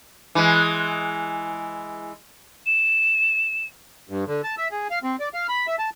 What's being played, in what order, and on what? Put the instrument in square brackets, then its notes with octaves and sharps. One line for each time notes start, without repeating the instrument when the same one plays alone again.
[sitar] E3 G#3
[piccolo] E7
[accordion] G2
D3
A5
E5
G#4
F5
C4
D5
F5
B5
E5
A5